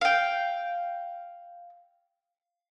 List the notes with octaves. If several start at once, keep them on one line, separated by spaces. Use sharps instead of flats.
F5 G5